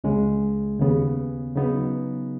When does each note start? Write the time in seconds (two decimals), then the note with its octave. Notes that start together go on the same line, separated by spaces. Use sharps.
0.04 C#2 C#3 G#3
0.79 D#2 C#3 B3
1.56 C#3 F#3 B3 D#4